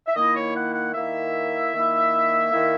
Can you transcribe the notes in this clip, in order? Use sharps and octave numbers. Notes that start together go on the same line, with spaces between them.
E5
D#3 A#3 E4 D#5
C#5
F#5
F#5
D#3 A#3 E4 E5
D#3 A#3 E4
D#3 A#3 E4